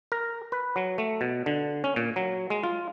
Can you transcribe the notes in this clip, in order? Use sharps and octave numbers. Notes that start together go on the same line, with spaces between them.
A#4
B4
F#3
A3
B2
D3
C#4
A#2
F#3
G#3
F4